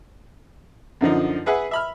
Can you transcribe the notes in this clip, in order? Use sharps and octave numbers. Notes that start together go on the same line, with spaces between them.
F#2 D3 F3 D#4
G#4 B4 E5 F#5 G#5
E5 B5 F6